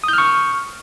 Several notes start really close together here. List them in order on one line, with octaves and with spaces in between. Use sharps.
D#6 G6 F6 C#6